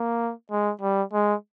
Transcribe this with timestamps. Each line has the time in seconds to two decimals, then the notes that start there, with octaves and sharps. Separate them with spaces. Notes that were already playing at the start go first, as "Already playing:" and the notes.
Already playing: A#3
0.51 G#3
0.81 G3
1.13 G#3